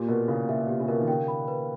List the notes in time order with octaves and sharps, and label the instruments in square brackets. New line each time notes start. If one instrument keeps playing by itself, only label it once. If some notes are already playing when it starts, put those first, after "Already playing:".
Already playing: [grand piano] A#2 [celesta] G4
[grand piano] B2 [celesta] A#4
[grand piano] C#3 [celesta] E4
[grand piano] C#3 [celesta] E5
[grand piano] B2 [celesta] G4
[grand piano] C#3
[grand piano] B2 [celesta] A#4
[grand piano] D#3
[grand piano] C#3 [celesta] G5
[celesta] B5
B4